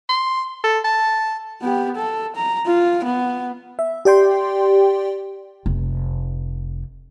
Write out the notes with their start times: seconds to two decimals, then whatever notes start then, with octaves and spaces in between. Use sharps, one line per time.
0.09 C6
0.64 A4
0.85 A5
1.61 B3 G4
1.95 A4
2.35 A#5
2.66 F4
3.04 B3
3.79 E5
4.05 G4 D5 G5 C6
5.66 F1